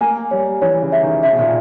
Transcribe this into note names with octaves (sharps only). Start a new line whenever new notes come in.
A#3 G#5
G3 C#5
E3 C#5
C#3
E5
D#3
C#3 E5
B2
A#2